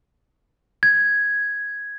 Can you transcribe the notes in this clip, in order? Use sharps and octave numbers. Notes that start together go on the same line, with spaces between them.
G#6